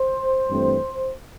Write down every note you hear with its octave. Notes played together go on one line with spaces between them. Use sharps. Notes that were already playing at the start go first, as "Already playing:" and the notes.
Already playing: C5
G2 E3 A3 C4